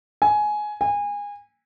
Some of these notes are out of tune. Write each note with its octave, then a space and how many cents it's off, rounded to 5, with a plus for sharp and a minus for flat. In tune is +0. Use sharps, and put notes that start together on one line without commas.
G#5 +15
G#5 -25